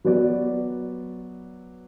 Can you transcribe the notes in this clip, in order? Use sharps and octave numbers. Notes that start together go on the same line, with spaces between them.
F#3 B3 F#4 B4 D5